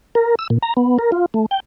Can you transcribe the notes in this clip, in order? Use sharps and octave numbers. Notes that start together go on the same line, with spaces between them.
A#4
E6
A#2
A#5
B3
A#4
F4
A3
G5